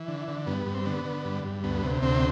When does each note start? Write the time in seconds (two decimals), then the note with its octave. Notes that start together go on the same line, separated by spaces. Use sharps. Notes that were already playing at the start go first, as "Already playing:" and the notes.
Already playing: E3
0.08 D3
0.28 D3
0.47 G2 B3
0.66 G2
0.74 C4
0.85 D3 B3
1.05 D3
1.25 G2
1.44 G2
1.64 D2 B3
1.83 C3
2.02 D2 C4